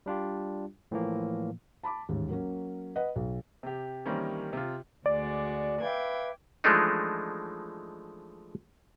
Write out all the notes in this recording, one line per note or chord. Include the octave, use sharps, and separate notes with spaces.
G3 D4 F4 G4
A2 E3 F3 A#3
A5 B5 D6
A1 D#2 G#2
F#3 A#3 C#4
B4 D#5 F#5
B1
C3 G4
D#3 E3 G3 A#3 C4 C#4
C3 F4
D2 G#3 F#4 D5
B4 E5 F5 G5 D6 G#6
E3 F3 G#3 A3 D4 D#4